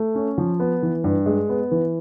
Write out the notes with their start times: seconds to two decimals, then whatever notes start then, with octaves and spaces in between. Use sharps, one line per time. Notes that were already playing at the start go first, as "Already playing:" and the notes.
Already playing: A3
0.15 C#4
0.38 F3
0.60 B3
0.83 E3
1.04 G2
1.26 G#3
1.49 B3
1.71 E3